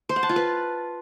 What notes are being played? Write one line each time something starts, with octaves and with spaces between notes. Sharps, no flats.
C5
F#5
A5
F4
B4